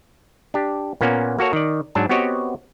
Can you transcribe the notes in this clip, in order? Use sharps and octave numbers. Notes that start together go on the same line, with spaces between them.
D4 G4
A#2 A#3 B3 C#4
A#3 F#4 A4 C#5
D#3 D5
G#2 F#3 D4 A5
B3 C4 F#4 G4 C#5 D#5